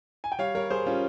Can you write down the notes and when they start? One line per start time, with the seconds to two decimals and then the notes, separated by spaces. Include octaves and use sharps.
0.24 G#5
0.32 G5
0.39 G3 C#5 F5
0.55 G3 A#4 C#5
0.71 G3 G#4 C5
0.86 G3 C#4 F4